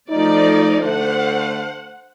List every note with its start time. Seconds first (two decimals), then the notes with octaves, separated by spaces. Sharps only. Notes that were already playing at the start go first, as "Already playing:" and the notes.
0.10 F3 A3 D#4 D5
0.82 D3 A3 C5 F#5